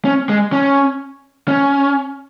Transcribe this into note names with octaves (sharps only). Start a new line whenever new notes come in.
C#4
G#3
C#4
C#4